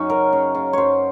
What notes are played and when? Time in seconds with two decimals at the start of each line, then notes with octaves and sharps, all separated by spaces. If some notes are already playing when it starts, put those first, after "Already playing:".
Already playing: F#2 F#3 C#4 D#4
0.09 C#3 A#4
0.33 C#3
0.55 C#3
0.73 F#2 C5 C#5